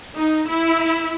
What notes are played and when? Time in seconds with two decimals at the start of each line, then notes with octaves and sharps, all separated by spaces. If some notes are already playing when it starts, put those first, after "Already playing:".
0.17 D#4
0.49 E4